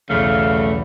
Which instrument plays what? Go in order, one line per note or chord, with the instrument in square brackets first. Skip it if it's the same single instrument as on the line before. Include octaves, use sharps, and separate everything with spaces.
[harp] B1 E2 [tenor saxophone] C#3 [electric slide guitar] A3 [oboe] F5